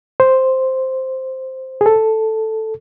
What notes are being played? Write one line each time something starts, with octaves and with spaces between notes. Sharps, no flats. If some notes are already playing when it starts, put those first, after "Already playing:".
C5
G#4
A4